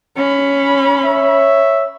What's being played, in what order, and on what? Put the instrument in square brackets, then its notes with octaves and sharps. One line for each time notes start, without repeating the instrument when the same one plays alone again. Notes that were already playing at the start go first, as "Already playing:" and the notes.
[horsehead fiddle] C#4 B5
[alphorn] C#5 [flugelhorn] E5